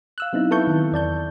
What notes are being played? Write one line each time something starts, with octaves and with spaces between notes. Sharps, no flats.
F5 E6 F#6
F#3 B3 C4 D#4 E4
A4 B4 E5 A5 C#6 G6
D#3
E2 D5 A5 G6